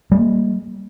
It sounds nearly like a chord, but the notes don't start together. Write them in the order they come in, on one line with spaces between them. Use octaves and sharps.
G3 A3 A#3